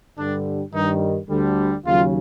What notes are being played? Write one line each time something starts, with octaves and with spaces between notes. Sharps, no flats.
G2 D3 G3 D4
G2 D#3 G3 D#4
D2 D3 G3
D#2 C#3 F#3 F4